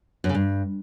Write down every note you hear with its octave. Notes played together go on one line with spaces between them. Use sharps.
F#2
C#3
G2